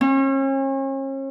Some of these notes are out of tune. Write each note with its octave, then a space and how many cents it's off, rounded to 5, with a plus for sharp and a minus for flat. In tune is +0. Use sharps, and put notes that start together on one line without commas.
C#4 -40